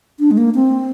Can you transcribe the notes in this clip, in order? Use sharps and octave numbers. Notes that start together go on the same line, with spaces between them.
D4
G#3
A#3
C4